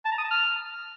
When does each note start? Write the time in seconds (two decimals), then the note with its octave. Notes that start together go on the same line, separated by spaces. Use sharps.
0.05 A5
0.12 A#5
0.18 D#6
0.24 A5
0.31 F6